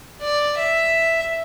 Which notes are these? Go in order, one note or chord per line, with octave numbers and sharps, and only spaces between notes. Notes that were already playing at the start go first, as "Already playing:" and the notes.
D5
E5